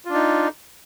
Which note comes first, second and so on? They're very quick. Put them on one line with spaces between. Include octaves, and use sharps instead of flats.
F4 D4 D#4